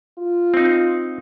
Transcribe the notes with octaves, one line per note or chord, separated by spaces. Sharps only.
F4
C4 D#4